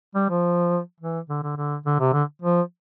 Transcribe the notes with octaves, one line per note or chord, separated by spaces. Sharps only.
G3
F3
E3
D3
D3
D3
D3
C3
D3
F3